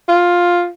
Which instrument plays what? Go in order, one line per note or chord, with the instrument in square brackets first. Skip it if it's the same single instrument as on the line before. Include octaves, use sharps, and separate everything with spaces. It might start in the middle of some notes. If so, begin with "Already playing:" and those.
[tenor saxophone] F4